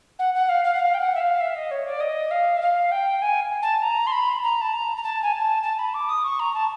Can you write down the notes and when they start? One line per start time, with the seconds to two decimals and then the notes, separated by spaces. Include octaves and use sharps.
0.19 F#5
0.35 F#5
0.49 F5
0.64 F5
0.74 F#5
0.79 F5
0.94 G5
1.00 F#5
1.14 E5
1.20 F5
1.40 E5
1.55 D#5
1.71 C#5
1.86 D5
2.00 D#5
2.31 F5
2.57 E5
2.61 F5
2.91 G5
3.22 G#5
3.62 A5
3.82 A#5
4.07 C6
4.12 B5
4.43 A#5
4.61 A5
4.72 A#5
4.96 A#5
5.03 A5
5.22 G#5
5.32 A5
5.63 A5
5.79 B5
5.94 D6
6.09 D#6
6.24 C#6
6.39 A#5
6.54 A5